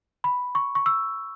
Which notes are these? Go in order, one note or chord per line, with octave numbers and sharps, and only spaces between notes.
B5
C#6
C#6
E6